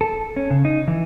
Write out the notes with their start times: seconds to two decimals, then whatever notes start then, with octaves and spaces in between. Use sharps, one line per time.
0.01 A4
0.36 C#4
0.51 C#3
0.65 D#4
0.88 E3